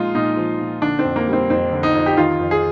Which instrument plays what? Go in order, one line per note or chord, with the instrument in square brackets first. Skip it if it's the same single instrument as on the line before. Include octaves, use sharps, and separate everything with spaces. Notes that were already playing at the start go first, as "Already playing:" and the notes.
Already playing: [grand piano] A#2 F3 G#3 D#4 F4
A#2 D#4
F3
A#2
D3 D4
C4
F2
A#3
G3
C4
F2 C4
D3
D#4
F2
G4
D#3 F4
F2
G#4